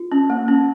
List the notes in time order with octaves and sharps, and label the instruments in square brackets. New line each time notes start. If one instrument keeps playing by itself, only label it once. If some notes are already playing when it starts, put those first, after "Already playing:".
Already playing: [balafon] F4
C#4
A#3
C#4